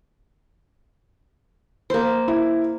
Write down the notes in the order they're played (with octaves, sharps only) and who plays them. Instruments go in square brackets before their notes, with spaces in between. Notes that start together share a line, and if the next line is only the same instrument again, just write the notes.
[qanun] A#3 C5
[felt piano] E4